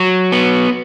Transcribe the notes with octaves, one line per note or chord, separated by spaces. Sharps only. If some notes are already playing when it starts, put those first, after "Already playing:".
Already playing: F#3
B3